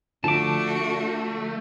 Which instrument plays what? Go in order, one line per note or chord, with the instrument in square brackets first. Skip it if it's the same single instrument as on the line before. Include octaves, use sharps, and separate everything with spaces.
[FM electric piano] D3 F3 [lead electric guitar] A3 [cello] D4 F#4 [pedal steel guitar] A5 D6